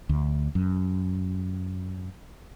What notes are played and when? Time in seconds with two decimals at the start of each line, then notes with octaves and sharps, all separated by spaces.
0.09 D2
0.55 F#2